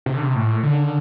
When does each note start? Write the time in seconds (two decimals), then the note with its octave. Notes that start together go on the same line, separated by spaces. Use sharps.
0.06 C3
0.14 D3
0.22 C3
0.35 A2
0.63 D3